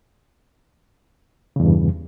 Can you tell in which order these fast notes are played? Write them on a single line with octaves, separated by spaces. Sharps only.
C#3 E2 G2